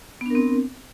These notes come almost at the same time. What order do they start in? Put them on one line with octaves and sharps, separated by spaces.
B3 D4 A#4 C4